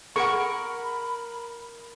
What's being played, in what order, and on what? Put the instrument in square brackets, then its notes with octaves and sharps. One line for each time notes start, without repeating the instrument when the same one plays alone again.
[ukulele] G#4 F#5 [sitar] A#4 [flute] B5 [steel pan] C#6